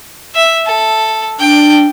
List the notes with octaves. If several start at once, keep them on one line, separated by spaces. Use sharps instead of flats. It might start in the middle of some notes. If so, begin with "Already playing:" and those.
E5
A4
D4 G5